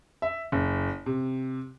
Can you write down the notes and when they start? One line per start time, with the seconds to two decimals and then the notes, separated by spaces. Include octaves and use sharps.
0.22 E5
0.52 F#1
1.06 C3